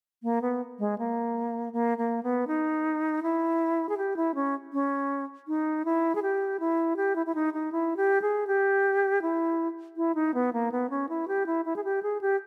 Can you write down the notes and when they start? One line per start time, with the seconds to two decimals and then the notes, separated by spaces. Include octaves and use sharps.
0.23 A#3
0.42 B3
0.79 G#3
0.98 A#3
1.73 A#3
1.98 A#3
2.23 B3
2.47 D#4
3.23 E4
3.89 G#4
3.97 G4
4.17 E4
4.35 C#4
4.73 C#4
5.48 D#4
5.85 E4
6.15 G#4
6.22 G4
6.60 E4
6.97 G4
7.16 E4
7.26 E4
7.35 D#4
7.54 D#4
7.72 E4
7.97 G4
8.22 G#4
8.47 G4
9.22 E4
9.97 E4
10.15 D#4
10.34 B3
10.53 A#3
10.72 B3
10.90 C#4
11.09 E4
11.28 G4
11.46 E4
11.65 E4
11.76 G#4
11.84 G4
12.03 G#4
12.21 G4